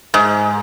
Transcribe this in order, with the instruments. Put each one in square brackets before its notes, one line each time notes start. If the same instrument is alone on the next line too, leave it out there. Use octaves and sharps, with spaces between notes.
[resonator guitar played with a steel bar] G#2